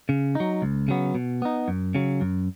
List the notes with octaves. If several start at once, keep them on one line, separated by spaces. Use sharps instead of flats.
C#3
F#3 D#4
C#2
C#3 F#3 B3
B2
B3 D#4
F#2
C#3 F#3
F#2